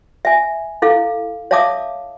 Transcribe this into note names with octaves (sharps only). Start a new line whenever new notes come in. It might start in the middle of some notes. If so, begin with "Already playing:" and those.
E5 G#5
E4 A4 F5
C#5 E5 F5 A5 D6 D#6